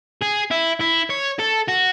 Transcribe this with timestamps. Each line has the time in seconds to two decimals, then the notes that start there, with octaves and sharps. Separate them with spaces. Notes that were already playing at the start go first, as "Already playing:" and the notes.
0.22 G#4
0.51 E4
0.81 E4
1.10 C#5
1.39 A4
1.68 F#4